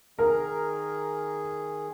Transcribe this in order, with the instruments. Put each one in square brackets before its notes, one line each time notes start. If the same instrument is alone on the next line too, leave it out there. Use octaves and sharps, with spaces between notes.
[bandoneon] D#3 G#4 [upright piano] A#4